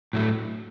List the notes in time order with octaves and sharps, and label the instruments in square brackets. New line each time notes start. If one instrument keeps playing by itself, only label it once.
[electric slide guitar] A2 F#3 A3